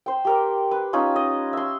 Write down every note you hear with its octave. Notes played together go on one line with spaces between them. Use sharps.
C5 G5
G4 A#4 D6
B4
C#4 D#4 F4
D#5
E5 C6